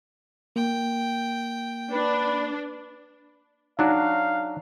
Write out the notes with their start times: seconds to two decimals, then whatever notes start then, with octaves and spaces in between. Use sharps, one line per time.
0.56 A#3 G5
1.92 D4 B4
3.79 F#3 D4 D#4 F#4 F5